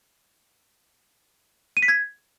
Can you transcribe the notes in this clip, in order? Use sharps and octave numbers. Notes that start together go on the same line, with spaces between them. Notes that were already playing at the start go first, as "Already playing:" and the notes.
D#7
B6
G#6